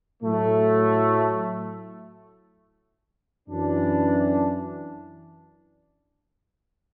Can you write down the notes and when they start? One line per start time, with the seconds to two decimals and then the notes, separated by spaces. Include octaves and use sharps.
0.23 A2 F#3 A3
3.49 F#2 E3 D4